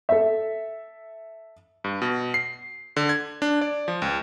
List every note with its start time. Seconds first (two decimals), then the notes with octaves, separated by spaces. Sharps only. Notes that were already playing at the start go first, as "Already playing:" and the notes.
0.09 A4 E5
1.84 G2
2.02 B2
2.34 C7
2.96 D3
3.09 G#6
3.42 D4
3.61 D5
3.88 F3
4.02 C#2